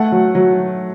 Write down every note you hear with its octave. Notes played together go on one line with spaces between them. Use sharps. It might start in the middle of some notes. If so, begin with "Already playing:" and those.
Already playing: A3 F#5
F#3
F#3